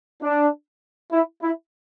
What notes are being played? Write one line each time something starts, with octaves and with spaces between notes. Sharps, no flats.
D4
E4
E4